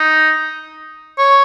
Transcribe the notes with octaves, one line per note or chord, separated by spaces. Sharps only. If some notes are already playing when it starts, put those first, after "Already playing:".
Already playing: D#4
C#5